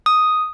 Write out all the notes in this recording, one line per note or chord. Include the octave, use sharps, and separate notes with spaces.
D#6